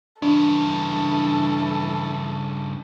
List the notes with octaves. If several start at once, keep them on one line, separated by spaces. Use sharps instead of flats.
G2 C#3 E3 D4 A4